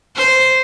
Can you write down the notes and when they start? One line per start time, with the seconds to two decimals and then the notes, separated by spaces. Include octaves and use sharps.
0.16 C5